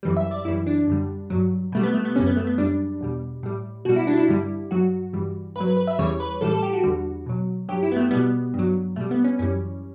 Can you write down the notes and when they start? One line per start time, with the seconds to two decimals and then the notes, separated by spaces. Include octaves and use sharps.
0.03 F#2 E3 G3
0.17 E5
0.31 D5
0.45 F#2 E3 G3 E4
0.67 D4
0.87 F#2 D3 G3
1.30 G2 F#3
1.72 B2 G3 A3
1.83 B3
1.94 A3
2.05 B3
2.16 F#2 C#3 G3 C#4
2.26 B3
2.37 A3
2.47 B3
2.58 F#2 C#3 G3 D4
3.01 E2 B2 G3
3.43 A2 G3
3.85 B2 G3 F#4
3.96 E4
4.07 D4
4.18 E4
4.28 G2 D3 G3
4.71 G2 F#3 F#4
5.13 G2 E3 G3
5.56 G2 F#3 B4
5.67 B4
5.77 B4
5.87 E5
5.99 E2 C#3 E3 G3 C#5
6.20 B4
6.41 A2 E3 G3 A4
6.51 A4
6.63 G4
6.73 F#4
6.84 E2 D3 G3
7.26 B2 F#3
7.69 G2 F#3 G4
7.83 E4
7.92 B3
7.97 A3
8.11 B2 G3 B3
8.54 G2 F#3
8.96 B2 G3 A3
9.11 B3
9.24 C#4
9.39 F#2 E3 G3 C#4